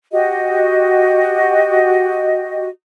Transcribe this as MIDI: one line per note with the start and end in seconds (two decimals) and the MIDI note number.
0.12 2.67 66
0.12 2.67 67
0.12 2.67 75